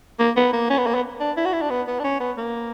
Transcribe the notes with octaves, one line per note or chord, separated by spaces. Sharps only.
A#3
B3
A#3
C#4
B3
A#3
B3
D4
E4
F#4
E4
D4
B3
B3
D4
C#4
B3
A#3